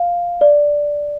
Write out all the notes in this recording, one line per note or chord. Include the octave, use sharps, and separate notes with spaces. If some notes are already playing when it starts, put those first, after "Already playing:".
Already playing: F5
D5